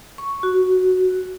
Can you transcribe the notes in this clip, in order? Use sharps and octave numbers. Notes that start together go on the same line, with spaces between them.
C#6
F#4